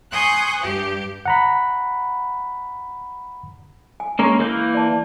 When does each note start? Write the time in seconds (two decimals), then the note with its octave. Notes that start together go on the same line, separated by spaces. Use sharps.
0.12 G#5 C6 C#6 D#6 F#6 G6
0.59 G2 G4
1.26 F#5 A#5 B5
4.00 G#5
4.19 G#3 A#3 C#4 C#6 E6
4.39 E3 A#3 A#4 G6
4.74 D5 A5